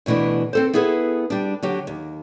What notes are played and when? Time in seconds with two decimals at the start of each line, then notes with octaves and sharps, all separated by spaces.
0.06 D2 B2 E3 A3 D4
0.53 C4 A4 C5
0.73 B3 E4 G#4 A4 B4
1.30 G3 D4
1.62 D3 F#3 G4
1.87 D#2